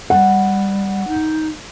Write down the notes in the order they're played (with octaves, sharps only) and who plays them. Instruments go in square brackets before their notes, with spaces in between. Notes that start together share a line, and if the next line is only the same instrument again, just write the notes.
[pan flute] G3 [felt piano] F#5
[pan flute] D#4